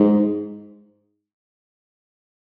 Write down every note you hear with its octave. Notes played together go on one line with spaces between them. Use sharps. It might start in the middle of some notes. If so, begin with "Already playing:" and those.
Already playing: G#2